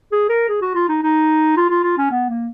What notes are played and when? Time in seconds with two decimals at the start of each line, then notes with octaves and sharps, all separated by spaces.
0.12 G#4
0.29 A#4
0.49 G#4
0.62 F#4
0.75 F4
0.89 D#4
1.03 D#4
1.57 F4
1.70 F4
1.84 F4
1.98 C#4
2.11 B3
2.29 A#3